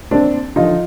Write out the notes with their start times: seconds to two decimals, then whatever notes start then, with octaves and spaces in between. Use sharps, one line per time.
0.11 D#2 C4 D4
0.56 D3 F3 D#4 F4